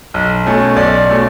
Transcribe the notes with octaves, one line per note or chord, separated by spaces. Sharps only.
B1
B2 A3 C#4
B1 D5
B2 A3 C#4